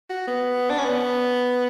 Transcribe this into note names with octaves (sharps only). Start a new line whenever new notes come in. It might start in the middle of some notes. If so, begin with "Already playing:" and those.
F#4
B3
D4
C#4
B3